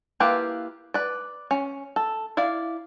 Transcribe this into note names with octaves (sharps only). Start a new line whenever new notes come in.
A#3 E4 F4 G4 B4
B4 D5
C#4
A4
E4 D5 F5